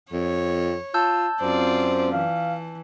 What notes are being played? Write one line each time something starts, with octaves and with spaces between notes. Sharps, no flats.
F2 C#5
F4 A5 E6 G6
F#2 C4 F4 C5 D5
E3 F5